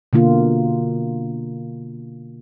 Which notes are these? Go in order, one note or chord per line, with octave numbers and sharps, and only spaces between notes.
B2 D3 A#3 F4